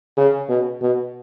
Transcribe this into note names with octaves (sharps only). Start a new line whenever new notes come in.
C#3
B2
B2